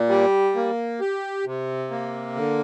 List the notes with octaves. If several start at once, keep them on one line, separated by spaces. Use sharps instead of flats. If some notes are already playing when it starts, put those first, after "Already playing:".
Already playing: A#2
G3
A#3
G4
C3
A#3
D3